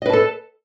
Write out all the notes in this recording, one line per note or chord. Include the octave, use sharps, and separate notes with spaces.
A4 B4 D#5 A5